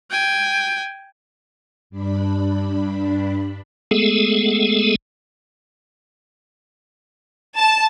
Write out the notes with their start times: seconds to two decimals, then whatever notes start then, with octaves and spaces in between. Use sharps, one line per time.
0.11 G5 G#5
1.90 G2 D4 B5
3.91 G#3 A3 B3 G#4 A4
7.57 A5